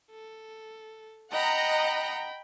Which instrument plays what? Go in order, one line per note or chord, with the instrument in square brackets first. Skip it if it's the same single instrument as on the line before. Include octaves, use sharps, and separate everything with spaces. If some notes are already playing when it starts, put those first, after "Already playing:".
[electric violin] A4
[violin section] D#5 F#5 A#5 [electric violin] G5 B5